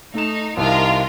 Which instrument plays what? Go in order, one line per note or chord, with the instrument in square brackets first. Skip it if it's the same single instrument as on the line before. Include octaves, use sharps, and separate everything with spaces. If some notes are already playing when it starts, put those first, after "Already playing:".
[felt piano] A3 E7 [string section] D#4
[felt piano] C2 [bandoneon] C3 D#3 [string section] F4 A#4